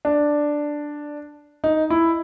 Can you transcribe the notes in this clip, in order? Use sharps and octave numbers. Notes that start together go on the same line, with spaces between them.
D4
D#4
E4